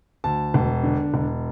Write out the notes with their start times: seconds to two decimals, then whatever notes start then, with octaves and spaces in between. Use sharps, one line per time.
0.24 D2 A5
0.54 E1
0.83 D3
1.14 E1